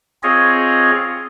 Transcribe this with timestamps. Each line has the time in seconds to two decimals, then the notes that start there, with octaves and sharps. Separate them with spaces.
0.23 C4 F4 G#4 C#5 D#5